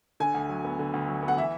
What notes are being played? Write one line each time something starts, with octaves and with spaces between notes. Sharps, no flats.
D3 G#5
D2
F#3
B3
D3
D2
F#3
B3
F#5
E3 E5